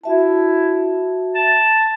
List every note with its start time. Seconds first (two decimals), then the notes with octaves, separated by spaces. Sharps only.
0.04 E4 F#4 E5 A5
1.35 A5